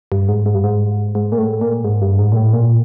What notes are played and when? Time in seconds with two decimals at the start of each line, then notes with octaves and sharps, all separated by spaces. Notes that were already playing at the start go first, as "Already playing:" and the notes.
0.12 G2
0.29 G#2
0.46 G#2
0.55 G2
0.64 G#2
1.15 G#2
1.32 A#2
1.38 A2
1.61 A#2
1.84 G#2
2.02 G2
2.19 G#2
2.32 A#2
2.36 A2
2.53 A#2